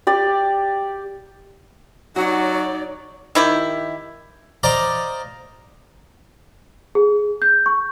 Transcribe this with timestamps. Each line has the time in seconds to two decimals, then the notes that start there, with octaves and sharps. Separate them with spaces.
0.07 G4 D5
2.16 F#3 D#4 F#4 C#5 D5
3.35 D#3 E4 G4
4.63 C5 D5 D#5 F5 A#5
6.95 G#4
7.42 G6
7.66 C#6